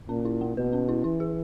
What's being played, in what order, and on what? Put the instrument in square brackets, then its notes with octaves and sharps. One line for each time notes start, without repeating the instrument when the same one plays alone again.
[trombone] A#2 [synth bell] C#4
[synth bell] E4
A#3
[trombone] B2 [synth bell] B4
[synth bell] C#4
E4
[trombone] E3 [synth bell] E4
[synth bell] G#4